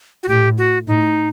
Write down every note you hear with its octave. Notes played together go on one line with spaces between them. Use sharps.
F#4
A2 G4
F#4
A2 D#4